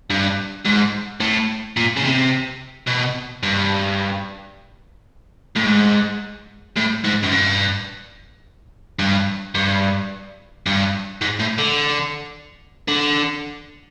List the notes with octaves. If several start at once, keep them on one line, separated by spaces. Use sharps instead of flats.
G2
G#2
A2
A#2
C#3
C3
B2
G2
A2
G#2
A2
G#2
F#2
G2
G2
G2
G2
G#2
A2
D3
D3